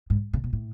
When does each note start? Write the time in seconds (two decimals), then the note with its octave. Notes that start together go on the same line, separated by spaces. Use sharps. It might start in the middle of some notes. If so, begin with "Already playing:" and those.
0.10 G#2
0.33 C#3
0.44 B2
0.53 A2